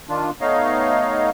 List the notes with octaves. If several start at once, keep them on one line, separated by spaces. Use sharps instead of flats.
D#3 D4 F4
A3 B3 D#4 C#5 D#5 F5